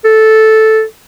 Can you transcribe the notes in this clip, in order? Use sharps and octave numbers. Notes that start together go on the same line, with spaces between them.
A4